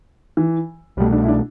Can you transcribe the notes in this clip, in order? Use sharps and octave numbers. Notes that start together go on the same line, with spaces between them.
E3
C2 B2 G3 A3
D4
E4
D4